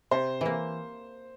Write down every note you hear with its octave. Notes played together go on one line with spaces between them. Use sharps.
C3 C5
E3 A#3